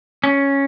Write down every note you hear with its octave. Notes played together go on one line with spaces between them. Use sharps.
C#4